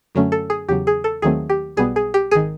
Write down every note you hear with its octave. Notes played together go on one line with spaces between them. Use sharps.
F#2 D3 F#3 A3 C#4
A4
G#4
E2 C#3 F#3 G4
G#4
A4
D#2 D#3 F#3 A3 C4 G#4
G4
B1 B2 G3 B3 G#4
G#4
G4
G#1 D#3 G#4